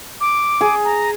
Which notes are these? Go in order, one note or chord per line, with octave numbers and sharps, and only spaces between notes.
D6
G#4
A#5